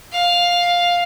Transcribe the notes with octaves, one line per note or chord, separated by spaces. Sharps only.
F5